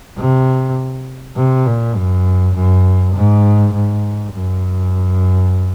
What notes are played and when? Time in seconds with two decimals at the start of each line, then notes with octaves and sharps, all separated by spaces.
0.17 C3
1.36 C3
1.66 A#2
1.96 F#2
2.54 F#2
3.15 G#2
3.73 G#2
4.33 F#2